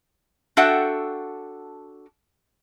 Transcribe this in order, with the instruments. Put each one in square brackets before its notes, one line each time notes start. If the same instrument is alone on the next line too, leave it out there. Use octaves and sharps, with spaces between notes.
[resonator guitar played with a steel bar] D4 F#4 A4 E5 F#5 G5